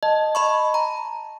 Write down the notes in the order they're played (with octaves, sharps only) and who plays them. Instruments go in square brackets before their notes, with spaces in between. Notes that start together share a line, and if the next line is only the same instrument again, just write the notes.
[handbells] D#5 [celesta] A5
[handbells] D#5 B5 C#6
A#5